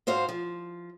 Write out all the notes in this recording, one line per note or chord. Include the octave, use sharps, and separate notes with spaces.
G#2 F#4 C5 F5
F3